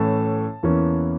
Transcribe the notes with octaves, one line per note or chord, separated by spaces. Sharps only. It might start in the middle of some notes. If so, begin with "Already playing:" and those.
Already playing: A2 E3 A3 C#4 A5
E2 E3 A#3 C#4